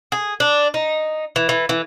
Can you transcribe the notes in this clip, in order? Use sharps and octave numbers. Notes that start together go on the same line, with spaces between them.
G#4
D4
D#4
E3
E3
E3